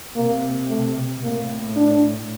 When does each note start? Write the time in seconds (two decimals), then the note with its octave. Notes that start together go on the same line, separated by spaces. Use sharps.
0.16 C3 A#3
0.69 A3
1.23 A2 A#3
1.76 D4